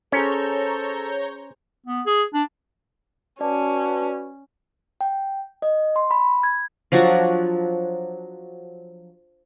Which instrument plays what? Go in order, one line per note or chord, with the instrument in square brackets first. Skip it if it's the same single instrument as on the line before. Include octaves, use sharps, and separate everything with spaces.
[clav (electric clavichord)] C#4 [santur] G#4 C5 [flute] A4 [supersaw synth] C#5 A#5 G6
[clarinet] B3
G#4
D4
[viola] C#4 [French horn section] F#4 B4 [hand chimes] D5 [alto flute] A5
[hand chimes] G5
D#5
C6
B5
G#6
[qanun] F3 F#3 D4 F#4